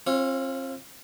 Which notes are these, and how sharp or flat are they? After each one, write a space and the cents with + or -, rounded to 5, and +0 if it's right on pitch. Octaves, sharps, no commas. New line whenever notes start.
C4 +40 F4 +0 C#5 -15